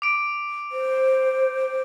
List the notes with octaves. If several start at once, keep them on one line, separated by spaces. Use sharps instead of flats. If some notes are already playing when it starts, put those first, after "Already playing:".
D6 D7
C5